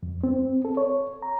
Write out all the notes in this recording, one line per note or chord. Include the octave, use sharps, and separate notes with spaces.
F2
C4
A4
C#5
A#5